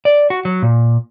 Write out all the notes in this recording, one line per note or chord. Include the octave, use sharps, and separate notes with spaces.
D5
F#4
F#3
A#2